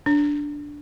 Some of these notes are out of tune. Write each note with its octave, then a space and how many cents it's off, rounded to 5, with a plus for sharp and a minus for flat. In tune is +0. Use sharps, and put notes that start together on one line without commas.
D4 -5